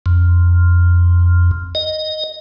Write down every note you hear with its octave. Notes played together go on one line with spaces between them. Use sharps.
F2
D#5